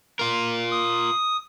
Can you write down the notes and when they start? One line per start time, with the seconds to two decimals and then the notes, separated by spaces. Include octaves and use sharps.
0.19 F4 A#4
0.71 D#6